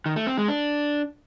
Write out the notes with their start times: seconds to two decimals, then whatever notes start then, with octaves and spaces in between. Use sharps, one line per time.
0.06 D#3
0.16 A3
0.27 C4
0.38 G#3
0.48 D4